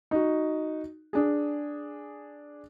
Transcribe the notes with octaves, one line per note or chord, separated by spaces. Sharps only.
D#4 F#4
D4 G#4